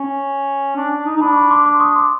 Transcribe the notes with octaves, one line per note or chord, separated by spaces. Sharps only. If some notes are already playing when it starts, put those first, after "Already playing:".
Already playing: C#4
D4
D4
D#4
D#4
D4 A5 B5
D6
B5 C#6
C6 D6
C6 D6
C#6 D#6
C6 D6